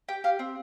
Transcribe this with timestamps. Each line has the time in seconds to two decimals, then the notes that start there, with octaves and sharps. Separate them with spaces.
0.08 G4 G5
0.24 G4 F5
0.39 C4